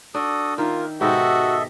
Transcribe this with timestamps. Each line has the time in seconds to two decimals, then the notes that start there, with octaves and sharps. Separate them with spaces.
0.14 D4 F#4 A4 D#6
0.58 D#3 A#3 F4 A#4 E5
1.01 G#2 B2 F#4 G4 A4 D#5 E5